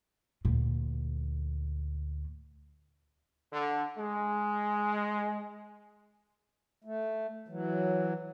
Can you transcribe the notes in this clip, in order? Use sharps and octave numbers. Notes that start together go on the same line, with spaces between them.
D2 A#2
D3
G#3
A3
E3 F#3